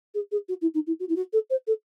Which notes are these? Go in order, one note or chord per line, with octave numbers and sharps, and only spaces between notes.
G#4
G#4
F#4
E4
D#4
E4
F#4
E4
F#4
A4
C5
A4